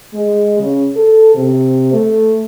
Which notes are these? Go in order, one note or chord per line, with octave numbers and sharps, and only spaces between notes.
G#3
C#3
A4
C3
A3